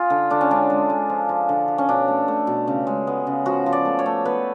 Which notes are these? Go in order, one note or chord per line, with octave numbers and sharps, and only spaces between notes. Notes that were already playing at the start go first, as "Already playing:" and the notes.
Already playing: F4 G#4
D3
D3 D4
C#4
G#3 D4
G#3
G#3
F3
F3
D3
F3
C#4
B2 D4
A3
A3
B2
C#3
G#3
B3
C#3
F3 F#4
F3
D5
A3
C#5
A3
B3 B4